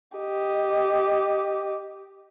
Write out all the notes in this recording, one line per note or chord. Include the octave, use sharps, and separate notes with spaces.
G4 D#5